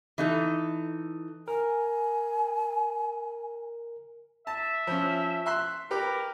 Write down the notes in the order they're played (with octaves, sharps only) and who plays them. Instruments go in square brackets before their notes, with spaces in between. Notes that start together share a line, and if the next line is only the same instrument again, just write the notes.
[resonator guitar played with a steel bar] E3 D#4 A4
[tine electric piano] A#4 [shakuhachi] G#5
[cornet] E5 [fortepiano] A5
[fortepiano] F3 C#4
E5 C6 F#6
[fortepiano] G4 B4 D6 [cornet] A#4